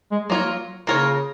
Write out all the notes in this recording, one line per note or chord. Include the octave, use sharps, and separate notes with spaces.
G#3
F#3 A#3 F4 A#4 C#5
F#3
C#3 A#3 F4 A#4 C#5